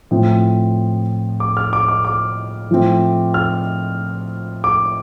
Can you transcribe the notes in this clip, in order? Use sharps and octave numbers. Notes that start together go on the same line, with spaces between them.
A2 F3 C4
D6
F6
D6
D6
D6
A2 F3 A3 C4
F6
D6